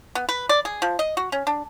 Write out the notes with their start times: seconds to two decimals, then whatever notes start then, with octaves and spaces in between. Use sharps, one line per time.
0.15 B3
0.29 B4
0.49 D5
0.65 G#4
0.82 F3
0.99 D#5
1.17 F#4
1.32 C#4
1.47 D4